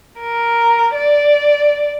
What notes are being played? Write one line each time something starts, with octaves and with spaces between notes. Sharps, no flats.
A#4
D5